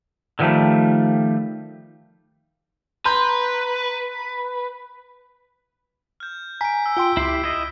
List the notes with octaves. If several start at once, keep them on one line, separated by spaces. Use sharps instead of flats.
D3 D#3 F3 G3 A3
B4 A#5 C6 G6
F6 G6
G#5 A#5 B6 D7
E6 G6
F4 G5 C6 D7 G7
C#2 E4 G4 C7
E4 D#5